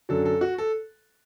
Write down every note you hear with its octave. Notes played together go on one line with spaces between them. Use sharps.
F#2 D3 F#3 A4
A4
F#4
A4